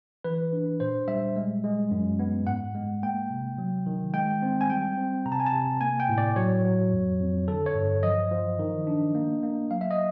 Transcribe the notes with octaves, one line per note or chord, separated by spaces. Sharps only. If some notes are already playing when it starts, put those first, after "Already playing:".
E3 B4
D4
A#2 C5
G3 E5
G#3
G#3
F#2
B3
G#2 F#5
G#3
A#3 G5
C3
F#3
D#3
G#3 G5
C4
G#5
G3 G5
C4
C3 A#5
A5
G#5
A5
C3
A#3 G#5
G5
A2
D5
F#3 C#5
F#3
F2
F2
D3 A4
C#5
G2
F3 D#5
F3
D#3
D4
A#3
A#3
F#3 F5
E5
D#5